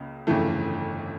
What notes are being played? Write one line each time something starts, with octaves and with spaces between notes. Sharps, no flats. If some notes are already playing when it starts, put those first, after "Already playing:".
Already playing: C#2 C#3 A#3
G1 F2 C#3 E3 A3